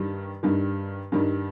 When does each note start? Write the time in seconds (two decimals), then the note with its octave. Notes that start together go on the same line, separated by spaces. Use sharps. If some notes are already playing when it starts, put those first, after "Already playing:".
Already playing: G2 D#3 G3
0.43 G2 D#3 G3
1.12 G2 D#3 G3